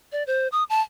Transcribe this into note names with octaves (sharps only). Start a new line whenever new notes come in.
D5
C5
D#6
A5